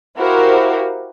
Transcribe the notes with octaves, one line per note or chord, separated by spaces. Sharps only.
E4 F#4 G4 A#4 C5 F5